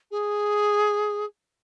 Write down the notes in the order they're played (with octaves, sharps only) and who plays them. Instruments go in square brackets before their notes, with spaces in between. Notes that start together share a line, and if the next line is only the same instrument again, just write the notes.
[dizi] G#4